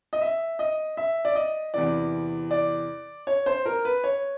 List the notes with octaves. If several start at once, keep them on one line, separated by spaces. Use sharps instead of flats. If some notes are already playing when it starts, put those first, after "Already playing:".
D#5
E5
D#5
E5
D5
D#5
E2 C3 E3 D5
D5
C#5
C5
A#4
B4
C#5